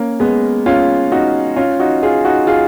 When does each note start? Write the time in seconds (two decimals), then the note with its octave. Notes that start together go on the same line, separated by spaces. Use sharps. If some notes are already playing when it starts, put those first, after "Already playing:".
Already playing: A#3 C#4
0.20 G#3 B3
0.66 C#4 F4
1.12 D#4 F#4
1.56 C#4 F4
1.79 D#4 F#4
2.03 F4 G#4
2.25 D#4 F#4
2.47 F4 G#4